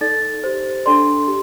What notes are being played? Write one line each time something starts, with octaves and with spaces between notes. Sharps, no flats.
D#4 A4 D5 A6
G4 C5
D4 A4 D5 C6
G4